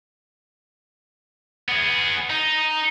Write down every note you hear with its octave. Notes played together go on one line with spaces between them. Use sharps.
B3 G#4
D#4